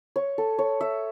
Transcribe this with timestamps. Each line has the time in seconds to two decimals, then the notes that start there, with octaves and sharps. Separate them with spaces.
0.16 C#5
0.38 A4
0.59 C#5
0.81 E5